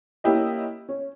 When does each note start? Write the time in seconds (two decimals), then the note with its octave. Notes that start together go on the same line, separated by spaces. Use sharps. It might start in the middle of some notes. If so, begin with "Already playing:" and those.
0.24 A#3 C#4 E4 G4 D#5
0.89 C#4